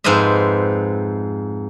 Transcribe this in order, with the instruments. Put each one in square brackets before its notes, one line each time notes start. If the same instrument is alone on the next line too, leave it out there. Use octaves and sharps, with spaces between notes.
[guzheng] F2 G#2 B4 C5 D#5 E5